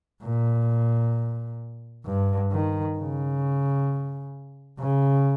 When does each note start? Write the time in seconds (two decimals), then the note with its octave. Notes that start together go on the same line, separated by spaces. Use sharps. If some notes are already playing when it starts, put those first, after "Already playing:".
0.23 A#2
2.05 G2
2.52 D#3
2.98 C#3
4.79 C#3